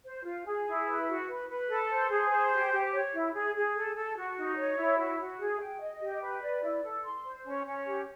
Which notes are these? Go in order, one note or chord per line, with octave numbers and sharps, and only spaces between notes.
C5
F4
G#4
E4
B4
F#4
B4
B4
A4
C5
G#4
C5
G4
G4
C#5
E4
G#4
G#4
A4
A4
F#4
D#4
C#5
E4
F#4
F#4
G#4
G5
D#5
G4
B4
D5
E4
A4
C6
C5
C#4
C#4
G4